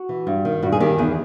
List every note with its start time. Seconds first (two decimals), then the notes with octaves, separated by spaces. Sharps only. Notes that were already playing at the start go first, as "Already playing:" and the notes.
Already playing: F#4
0.09 E3
0.27 G2
0.45 D#3
0.62 G2 F#4
0.72 G#4
0.80 D#3 G4
0.98 E2 G#4